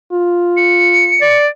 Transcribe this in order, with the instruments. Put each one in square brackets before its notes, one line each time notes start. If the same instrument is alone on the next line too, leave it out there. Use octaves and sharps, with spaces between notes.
[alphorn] F4
[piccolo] C#7
[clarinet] D5